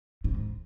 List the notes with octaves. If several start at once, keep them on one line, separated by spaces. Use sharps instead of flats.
G#2